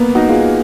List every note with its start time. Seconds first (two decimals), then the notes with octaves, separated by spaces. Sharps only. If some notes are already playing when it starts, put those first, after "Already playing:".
Already playing: A#3 B3
0.15 D#4 F#4
0.29 F4 G#4